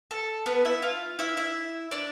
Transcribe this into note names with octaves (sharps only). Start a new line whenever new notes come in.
A4
B3 B4
E4 E5
F4 F5
E4 E5
E4 E5
D4 D5